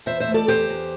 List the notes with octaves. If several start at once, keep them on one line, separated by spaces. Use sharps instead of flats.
E2 C5 E5
C5 E5
A3
A4 D5
E2 G4 C5
E2